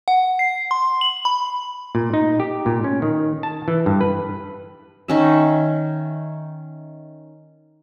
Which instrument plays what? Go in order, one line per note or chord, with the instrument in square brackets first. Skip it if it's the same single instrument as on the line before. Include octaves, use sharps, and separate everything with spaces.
[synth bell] F#5
C7
C6
F#7
B5
[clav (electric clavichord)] A#2
D#4
G4
A#2
C#4
D#3
A5
E3
G2
B4
[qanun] D#3 C#4 E5